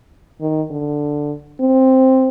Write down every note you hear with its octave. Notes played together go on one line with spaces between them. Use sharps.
D#3
D3
C4